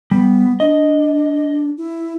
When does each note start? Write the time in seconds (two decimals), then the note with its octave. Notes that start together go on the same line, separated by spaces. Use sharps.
0.11 G3 B3
0.60 D4 D#5
1.78 E4